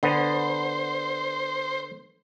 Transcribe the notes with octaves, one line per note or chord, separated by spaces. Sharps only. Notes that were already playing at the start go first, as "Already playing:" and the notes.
D3 B3 C5